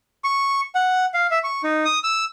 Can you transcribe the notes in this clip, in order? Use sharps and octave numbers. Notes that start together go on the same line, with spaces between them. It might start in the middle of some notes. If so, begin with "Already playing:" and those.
C#6
F#5
F5
E5
C#6
D#4
D#6
E6